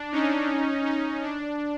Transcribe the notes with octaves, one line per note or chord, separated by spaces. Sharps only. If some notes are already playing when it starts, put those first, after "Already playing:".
Already playing: D4
C#4 D#4
C#4 D#4
D4